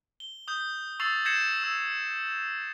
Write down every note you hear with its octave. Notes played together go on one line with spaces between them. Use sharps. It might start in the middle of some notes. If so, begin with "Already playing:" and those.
G7
D#6 G6 G7
C#6 E6 A6 C7 F7 G7
G6 G#6 A#6 C7 C#7 E7
E6